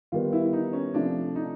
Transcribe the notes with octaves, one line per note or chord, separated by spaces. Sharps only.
D#3 G3 B3 F4
E4
D#4
C#4
C3 F3 A3 D4
D#4